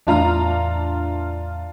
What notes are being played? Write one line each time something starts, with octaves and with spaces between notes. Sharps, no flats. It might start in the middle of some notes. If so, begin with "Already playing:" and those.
E2 A2 D4 F4 A#5 F6